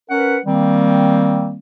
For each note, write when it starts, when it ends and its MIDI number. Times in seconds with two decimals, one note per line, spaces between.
0.10 0.38 61
0.10 0.38 70
0.10 0.38 71
0.10 0.38 78
0.46 1.58 51
0.46 1.58 55
0.46 1.58 58
0.46 1.58 60